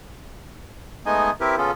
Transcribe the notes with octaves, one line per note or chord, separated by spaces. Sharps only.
G#3 A3 B3 D#4 D#5 G#5
C4 E4 G4 A#4 B4
C#3 B3 C#4 F4 A4